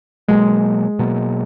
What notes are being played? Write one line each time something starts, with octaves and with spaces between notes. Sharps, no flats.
B2 F#3 G#3 A#3
B2 F#3 A#3